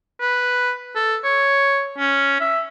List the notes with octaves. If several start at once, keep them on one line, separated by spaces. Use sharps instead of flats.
B4
A4
C#5
C#4
E5